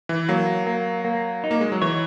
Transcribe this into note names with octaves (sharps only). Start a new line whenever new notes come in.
E3
F#3 A#3
A#3
A#3
D#4
A#3
G#3
F#3
E3 C#5